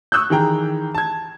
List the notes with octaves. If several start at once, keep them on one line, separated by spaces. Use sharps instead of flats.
C#6 D#6 E6 F#6 G6
D#3 E3 G#4 G5 A#5
A5 G#6